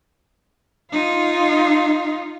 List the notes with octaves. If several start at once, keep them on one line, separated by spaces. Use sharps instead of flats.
D#4 F4